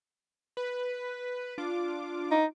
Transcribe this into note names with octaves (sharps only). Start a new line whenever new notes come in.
B4
D4 F4 D6
D#4